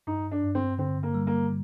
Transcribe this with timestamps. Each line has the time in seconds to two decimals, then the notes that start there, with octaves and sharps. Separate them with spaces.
0.07 G2 D#4
0.31 D4
0.43 G2
0.55 C4
0.79 D3 C4
1.03 A#3
1.14 G3
1.27 A#3